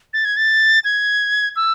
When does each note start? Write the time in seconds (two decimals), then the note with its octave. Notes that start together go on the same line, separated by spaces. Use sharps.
0.13 A6
0.25 G#6
0.37 A6
0.84 G#6
1.56 E6